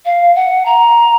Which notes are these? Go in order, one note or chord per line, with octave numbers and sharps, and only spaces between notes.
F5
F#5
A#5